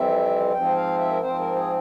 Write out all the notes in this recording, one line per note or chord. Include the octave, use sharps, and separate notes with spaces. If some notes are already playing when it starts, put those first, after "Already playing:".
Already playing: F2 E3 G3 C4 E5
G#2 F3 C4 G5
F5
E5
A#4
G#2 F3 C4 C5
A#4
G#4